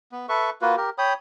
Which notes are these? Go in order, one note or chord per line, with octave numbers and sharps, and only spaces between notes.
B3
A4 B4 E5 C#6
A#3 F4 F#4 B4
G4 A#4
C#5 G5 B5 D#6